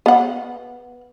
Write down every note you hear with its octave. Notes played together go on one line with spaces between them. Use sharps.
B3 F#5